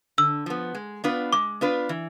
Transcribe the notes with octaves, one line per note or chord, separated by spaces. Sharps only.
D3 E6
F3 B3
G#3
B3 D4 F4 B4
G#3 D6
B3 D4 F4 B4
E3